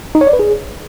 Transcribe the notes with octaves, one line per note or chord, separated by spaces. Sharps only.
D#4
C#5
D5
B4
G#4